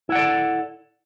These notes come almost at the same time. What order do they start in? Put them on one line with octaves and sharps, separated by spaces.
E4 F#5 D5 A4